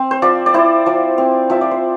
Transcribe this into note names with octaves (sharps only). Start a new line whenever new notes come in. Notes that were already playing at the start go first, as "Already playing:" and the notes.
Already playing: C4
C5
F3 D5
D5
E4 C5
F3
C4
F3 E5
D5
C5